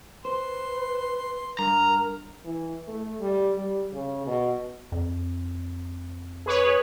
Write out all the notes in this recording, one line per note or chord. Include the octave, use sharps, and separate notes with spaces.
B4 C5 C6
G2 A#4 A#5
E3
A3
G3
G3
C#3
B2
F2
G#4 B4 C#5